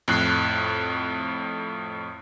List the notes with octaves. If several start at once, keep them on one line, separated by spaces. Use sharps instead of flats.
F2 A2 F#6 C7